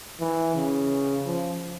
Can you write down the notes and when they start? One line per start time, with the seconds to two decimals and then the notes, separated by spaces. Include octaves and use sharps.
0.20 E3
0.55 C#3
1.26 F3